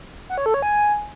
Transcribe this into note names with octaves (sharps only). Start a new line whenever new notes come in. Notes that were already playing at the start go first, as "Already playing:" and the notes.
F#5
C#5
A4
C#5
G#5